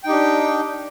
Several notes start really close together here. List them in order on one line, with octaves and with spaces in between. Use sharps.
G5 D#4 G4 D4